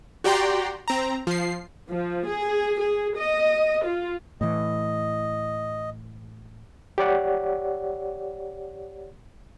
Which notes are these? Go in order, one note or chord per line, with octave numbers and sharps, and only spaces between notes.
F#4 G4 D5 G5 A#5 C6
C4 A#5
F3 C7
F3
G#4
G#4
D#5
F4
A2 E3 D#5
G4 C#5 D5 F#5